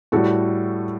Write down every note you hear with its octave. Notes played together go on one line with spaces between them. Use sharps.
A2 G3 F#4 A4